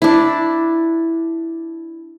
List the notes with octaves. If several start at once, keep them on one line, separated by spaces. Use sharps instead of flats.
D4 E4